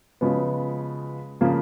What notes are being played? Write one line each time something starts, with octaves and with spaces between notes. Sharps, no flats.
C#3 F3 G#3 B3 F#4
C#3 F3 A#3